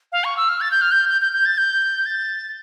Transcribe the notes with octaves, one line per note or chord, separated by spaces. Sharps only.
F5
C#6
E6
F6
A6
G6
F6
G6
G6
G6
G6
A6
G6
A6